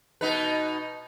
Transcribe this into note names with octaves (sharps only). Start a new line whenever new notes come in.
B2 D#4 B4